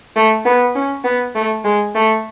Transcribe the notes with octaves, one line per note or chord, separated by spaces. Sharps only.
A3
B3
C#4
B3
A3
G#3
A3